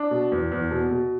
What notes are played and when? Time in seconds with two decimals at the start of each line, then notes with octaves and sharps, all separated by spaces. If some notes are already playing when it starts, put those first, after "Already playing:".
Already playing: D4
0.11 B2
0.32 E2
0.51 E2
0.71 B2
0.91 B2